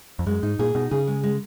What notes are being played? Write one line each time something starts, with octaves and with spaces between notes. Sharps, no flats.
F2
F#2 G#3
G#2 D#4
A#2 G#4
B2 D#4
C#3 G#4
G#3
G#3